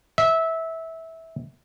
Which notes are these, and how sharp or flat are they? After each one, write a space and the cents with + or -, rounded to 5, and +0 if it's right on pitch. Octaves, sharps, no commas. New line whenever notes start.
E5 -15